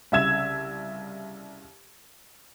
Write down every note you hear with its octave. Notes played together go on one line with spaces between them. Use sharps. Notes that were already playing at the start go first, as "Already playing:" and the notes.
C2 C#3 E5 E6 G#6 E7